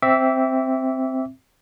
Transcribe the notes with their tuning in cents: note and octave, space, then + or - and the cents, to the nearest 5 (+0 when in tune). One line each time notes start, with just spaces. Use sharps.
C4 +0 E5 +0 D6 -35